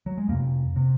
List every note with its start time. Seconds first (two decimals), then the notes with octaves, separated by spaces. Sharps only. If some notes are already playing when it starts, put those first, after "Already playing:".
0.06 F#3
0.18 G#3
0.29 F2 C3 A#3
0.76 C3